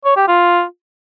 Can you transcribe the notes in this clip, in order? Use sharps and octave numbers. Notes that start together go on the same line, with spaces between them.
C#5
G4
F4